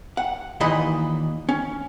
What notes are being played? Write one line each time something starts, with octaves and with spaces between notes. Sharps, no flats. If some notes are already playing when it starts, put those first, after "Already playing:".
F#5
D#2 A#2 E3 D#5 B5
C#4